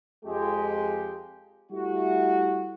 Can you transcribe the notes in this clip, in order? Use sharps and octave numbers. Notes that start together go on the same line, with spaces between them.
F2 G#3 G4
G3 A3 E4 F#4